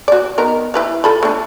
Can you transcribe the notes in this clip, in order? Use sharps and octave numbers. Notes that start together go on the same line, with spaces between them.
F#4 D5
D#3 B3 A#4
E4 B4 F5
F4 A4 B5
A3 D4